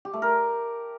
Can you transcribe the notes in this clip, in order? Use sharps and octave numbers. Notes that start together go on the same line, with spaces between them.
G4
A3
A#4